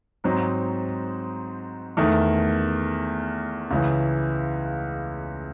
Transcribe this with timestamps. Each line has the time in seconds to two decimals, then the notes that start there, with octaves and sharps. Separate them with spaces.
0.24 G#2 F#3 C4 D#4
1.97 E2 D#3 A3
3.71 C#2 C#3 E3